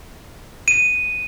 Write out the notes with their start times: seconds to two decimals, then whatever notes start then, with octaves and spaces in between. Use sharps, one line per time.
0.68 D#7